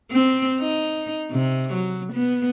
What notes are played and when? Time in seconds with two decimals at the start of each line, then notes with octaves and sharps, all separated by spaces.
0.12 C4
0.59 D#4
1.32 C3
1.74 F#3
2.13 B3